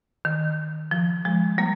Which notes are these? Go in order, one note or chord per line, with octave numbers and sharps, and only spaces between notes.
D#3
F3
F3 G#3
G3 A#3